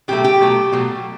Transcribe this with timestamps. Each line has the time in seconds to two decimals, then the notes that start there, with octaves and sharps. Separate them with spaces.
0.08 B2 F#3 A3 G4
0.24 G4
0.40 B2 F#3 A3
0.72 B2 F#3 A3